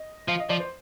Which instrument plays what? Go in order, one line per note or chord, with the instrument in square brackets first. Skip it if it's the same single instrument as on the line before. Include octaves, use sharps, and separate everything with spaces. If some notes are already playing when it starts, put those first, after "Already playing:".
Already playing: [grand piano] D#5
[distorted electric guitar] F3 [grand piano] F5
[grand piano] D#5
[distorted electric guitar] F3 [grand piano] D5
[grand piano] C5